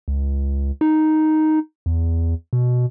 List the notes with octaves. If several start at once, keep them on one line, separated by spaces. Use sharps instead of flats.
C#2
D#4
E2
B2